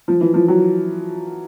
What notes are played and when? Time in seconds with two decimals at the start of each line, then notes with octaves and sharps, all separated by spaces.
0.08 F3
0.21 E3
0.34 F3
0.48 F#3